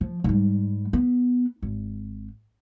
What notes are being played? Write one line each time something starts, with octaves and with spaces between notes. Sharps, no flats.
F3
G#2 G3
B3
G#1